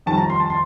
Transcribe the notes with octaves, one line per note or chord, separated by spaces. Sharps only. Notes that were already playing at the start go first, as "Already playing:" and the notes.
F2 D#3 G3 A5
A#5
C6
A5
C6